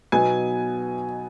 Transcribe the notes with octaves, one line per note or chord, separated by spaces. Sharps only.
B2 F#3 B3 D#4 G#5